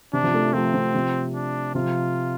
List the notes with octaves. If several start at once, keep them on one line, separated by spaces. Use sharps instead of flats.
C3 D4
C3 F3
F3 A3
F3 A3 C4
C3 F3
C3 F3
D4
C3 F3 F4